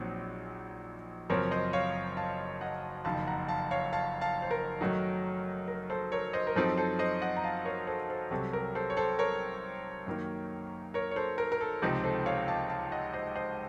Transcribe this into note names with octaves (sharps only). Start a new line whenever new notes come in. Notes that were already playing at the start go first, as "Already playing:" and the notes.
Already playing: A#1 A#2 F#3 C4 D#4
F#1 F#2 F3 C4 A#4 C#5
C5 D#5
C#5 F5
F5 A5
D#5 F#5
F#1 F2 D#3 F5 A5
F#5 A#5
F5 A5
C#5 F5
F5 A5
F5 A5
C5
A#4
F#2 D#3 F#3 A3 D#4
A#4
A4 C5
A#4 C#5
C5 D#5
A#4
F#2 F3 C4 D#4 A4 C5
A4 C5
C5 D#5
D#5 F#5
A#5
F5 A5
A#4 C#5
A4 C5
A4 C5
C2 C3 F#3 C4 A4
A#4
A4 C5
C#5
A4 C5
A#4 C#5
F#2 D#3 A#3 D#4
A#4 C#5
C#5
A4 C5
A#4
A#4
A4
C#2 C3 F3 C4 D#4
A4 C5
C#5 F5
F5 A5
F5 A5
D#5 F#5
C5 D#5
C5 D#5